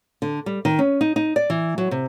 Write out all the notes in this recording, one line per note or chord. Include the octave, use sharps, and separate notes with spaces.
D3
G3
D#3
C#4
D#4
D#4
D5
E3
F#3
C3